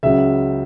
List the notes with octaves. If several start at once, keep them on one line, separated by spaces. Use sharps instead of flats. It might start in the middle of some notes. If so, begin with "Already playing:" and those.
C#2 C#3 F#3 E5